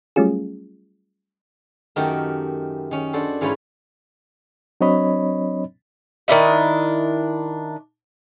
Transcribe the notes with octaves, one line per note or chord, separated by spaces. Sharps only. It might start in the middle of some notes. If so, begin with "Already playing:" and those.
F#3 G3 A3 C#4 F4 G#4
F#2 D#3 A3 F#4 G4 A#4
D#3 C#4
D4 F#4 A4 C5
G#2 E3 C#4 F4 C#5 B5
F#3 C4 D4 C#5 D#5 B5
D#3 D4 E4 D#5